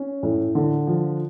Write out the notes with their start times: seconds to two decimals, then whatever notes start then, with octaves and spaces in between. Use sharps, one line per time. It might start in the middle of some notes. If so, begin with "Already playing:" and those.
Already playing: C#4
0.23 A2
0.55 D3
0.87 F3